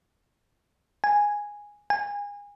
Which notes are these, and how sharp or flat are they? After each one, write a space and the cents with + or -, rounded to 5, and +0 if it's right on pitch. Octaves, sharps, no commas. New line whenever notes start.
G#5 -5
G#5 -30